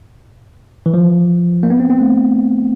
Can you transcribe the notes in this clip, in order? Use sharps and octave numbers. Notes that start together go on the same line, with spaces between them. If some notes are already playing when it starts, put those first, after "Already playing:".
E3
F3
A#3
B3
C4
C4
A3